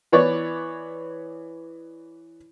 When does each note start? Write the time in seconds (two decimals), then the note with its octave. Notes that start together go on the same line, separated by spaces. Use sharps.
0.12 E3 B3 C#5 D5